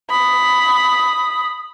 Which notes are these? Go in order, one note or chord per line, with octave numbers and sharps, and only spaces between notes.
B5 D#6